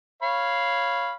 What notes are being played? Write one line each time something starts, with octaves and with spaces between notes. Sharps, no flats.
C#5 F5 B5